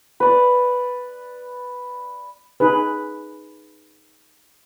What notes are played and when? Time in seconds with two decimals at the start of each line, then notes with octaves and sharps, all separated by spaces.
0.20 B4 D5
2.60 D#4 G#4 B4